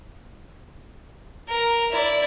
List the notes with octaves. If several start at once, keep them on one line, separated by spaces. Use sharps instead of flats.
A#4
E4 D5